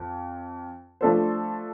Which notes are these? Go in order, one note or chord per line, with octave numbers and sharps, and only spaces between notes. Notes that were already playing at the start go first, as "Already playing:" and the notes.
Already playing: F2
F3 A3 D4 A4 C5